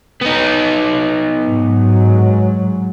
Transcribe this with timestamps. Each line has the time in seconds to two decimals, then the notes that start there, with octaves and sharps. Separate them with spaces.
0.22 B3 D#4
1.45 G#2 F#3